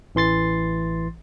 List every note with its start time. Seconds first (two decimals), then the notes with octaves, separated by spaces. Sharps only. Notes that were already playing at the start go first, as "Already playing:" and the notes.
0.15 A1 E3 C6 A6 C7